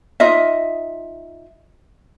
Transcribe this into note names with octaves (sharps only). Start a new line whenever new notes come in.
D#4 F4 D#5 E5